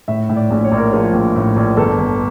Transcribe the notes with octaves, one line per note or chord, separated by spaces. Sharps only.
A2 E5
A2
D5
A#1
C#5
A#1
A#4
F3 C#5
A#1
A2
A#1
G1 A4
G1